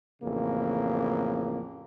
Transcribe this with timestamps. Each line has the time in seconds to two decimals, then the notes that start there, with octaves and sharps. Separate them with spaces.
0.21 A1 F2 C#3 A#3